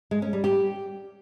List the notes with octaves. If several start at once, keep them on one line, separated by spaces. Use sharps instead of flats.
G#3
C#4
G3
G4